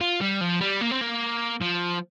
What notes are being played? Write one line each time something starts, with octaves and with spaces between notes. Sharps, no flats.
F4
G3
F3
G3
A#3
C4
A#3
F3